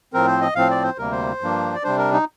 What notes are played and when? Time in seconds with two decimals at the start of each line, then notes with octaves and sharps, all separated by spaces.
0.13 A2 F3 C4 A#4
0.27 C5
0.41 D#5
0.55 A2 F3 C4 F5
0.70 D5
0.84 C5
0.98 D2 C3 G3 A#3 A#4
1.12 C5
1.41 G2 F3 A#3 D4
1.75 D5
1.84 C3 G3 D4 C5
1.98 A#4
2.12 D#4